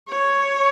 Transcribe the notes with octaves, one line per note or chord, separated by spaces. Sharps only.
C#5